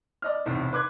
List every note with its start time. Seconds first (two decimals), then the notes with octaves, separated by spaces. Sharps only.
0.22 D5 D#5 F6
0.46 B1 E2 A2 C3
0.73 B4 C6 D6 F#6 G#6